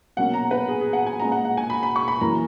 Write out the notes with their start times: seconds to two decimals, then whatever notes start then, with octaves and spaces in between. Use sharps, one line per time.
0.17 B2 F#3 A#3 C#4 F#5
0.34 A#5
0.51 B4
0.68 G#4
0.81 G#4
0.93 F#5
1.06 G#5
1.19 A#2 G#3 C#4 A#5
1.32 F#5
1.45 F#5
1.57 G#5
1.70 B5
1.83 B5
1.96 C#6
2.08 B5
2.21 F#2 E3 A#3 A#5